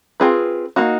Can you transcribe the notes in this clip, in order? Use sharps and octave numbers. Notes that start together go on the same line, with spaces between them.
C4 F4 G#4 B4
A#3 D#4 F#4